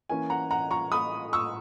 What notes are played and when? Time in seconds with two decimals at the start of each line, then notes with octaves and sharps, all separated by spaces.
0.09 E3 A#3 C#4 G#5
0.30 F#5 A#5
0.51 F#5 A#5
0.71 A#5 C#6
0.92 B5 D#6
1.33 C#6 E6